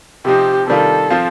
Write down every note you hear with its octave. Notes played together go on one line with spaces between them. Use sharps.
C3 F3 C4 D#4 G4
C3 D#3 G3 D4 F4 A4
F3 C4 F4